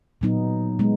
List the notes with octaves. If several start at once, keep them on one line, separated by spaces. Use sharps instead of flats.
A#2 F#3 B3 D#4
G#3 B3